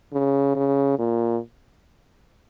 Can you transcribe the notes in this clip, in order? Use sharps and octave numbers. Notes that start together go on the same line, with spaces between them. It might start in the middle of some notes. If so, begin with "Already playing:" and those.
C#3
C#3
A#2